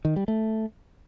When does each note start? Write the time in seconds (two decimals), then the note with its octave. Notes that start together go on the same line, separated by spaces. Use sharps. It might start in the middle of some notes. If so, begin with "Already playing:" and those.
0.05 D#3
0.16 G3
0.28 A3